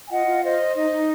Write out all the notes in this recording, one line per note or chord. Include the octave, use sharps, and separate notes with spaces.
G#5
F4 D#5 F#5
F4
C5 D#5
C5
D#4 D#5
D#4